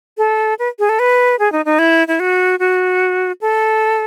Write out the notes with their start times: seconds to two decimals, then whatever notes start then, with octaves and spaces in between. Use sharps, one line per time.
0.18 A4
0.59 B4
0.79 G#4
0.89 A4
0.99 B4
1.39 G#4
1.52 D#4
1.65 D#4
1.79 E4
2.08 E4
2.20 F#4
2.59 F#4
3.41 A4